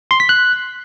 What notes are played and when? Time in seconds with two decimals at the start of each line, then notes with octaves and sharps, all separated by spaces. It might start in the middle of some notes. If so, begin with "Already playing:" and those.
0.11 C6
0.20 B6
0.29 F#6